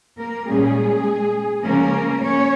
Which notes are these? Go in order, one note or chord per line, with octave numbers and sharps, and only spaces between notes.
A#3 A#4
A#2 G3 G#3 A#3 C#4 G#4
C#3 F3 G#3 A#3 C#4 A#4
C#4 C#5